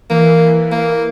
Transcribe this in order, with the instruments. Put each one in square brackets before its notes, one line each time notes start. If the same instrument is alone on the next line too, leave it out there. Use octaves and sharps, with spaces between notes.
[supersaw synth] E3 [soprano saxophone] A#3
[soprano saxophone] A#3